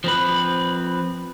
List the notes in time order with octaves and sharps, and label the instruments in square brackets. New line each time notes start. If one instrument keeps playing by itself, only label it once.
[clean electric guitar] F3 C4 B4